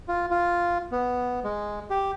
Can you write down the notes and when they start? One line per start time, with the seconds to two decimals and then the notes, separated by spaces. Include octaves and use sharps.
0.08 F4
0.31 F4
0.92 B3
1.44 G#3
1.90 G4